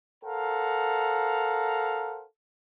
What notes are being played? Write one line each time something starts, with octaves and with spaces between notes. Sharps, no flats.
A4 A#4 C5 F5 F#5 A#5